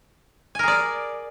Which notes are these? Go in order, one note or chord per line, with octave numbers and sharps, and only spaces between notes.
G#4 A#4 D5 G#5